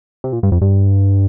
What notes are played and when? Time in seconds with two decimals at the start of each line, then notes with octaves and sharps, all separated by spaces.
0.24 C3
0.33 A#2
0.43 G2
0.52 F2
0.61 G2